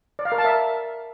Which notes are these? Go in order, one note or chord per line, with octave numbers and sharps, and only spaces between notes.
D5
F5
A#4
A5
E5